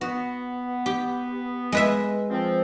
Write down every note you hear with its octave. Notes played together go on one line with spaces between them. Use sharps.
B3 F#4
G4
G#3 B4 E5
F3 C4